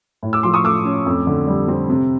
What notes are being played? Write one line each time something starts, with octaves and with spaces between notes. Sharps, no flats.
A2
D6 E6
F3 C6 D6
C#6 D#6
A3 D6 E6
C#4
F2
D3
G3
C4
C3